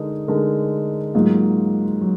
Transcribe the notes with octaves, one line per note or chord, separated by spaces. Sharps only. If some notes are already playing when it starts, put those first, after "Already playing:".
Already playing: D3 G#3 D#4 A#4
D3 G#3 D#4 A#4
G#2 F#3 A#3 F4
F#3